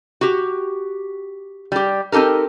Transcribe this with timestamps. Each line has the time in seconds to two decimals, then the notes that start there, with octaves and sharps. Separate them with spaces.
0.21 F#4 G4
1.72 G3 G4
2.12 C4 D#4 G4 A4 A#4